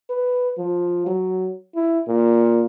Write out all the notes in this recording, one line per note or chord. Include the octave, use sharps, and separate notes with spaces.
B4
F3
F#3
E4
A#2